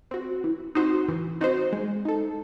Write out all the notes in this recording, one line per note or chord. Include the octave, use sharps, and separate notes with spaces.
C4 F#4
E3
C4 D#4 F#4 C5
E3
C4 D#4 F#4 C5
G#3
D#4 A4